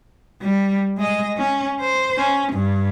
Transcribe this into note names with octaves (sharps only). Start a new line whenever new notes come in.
G3
G#3 D#5
C#4
C5
C#4
G2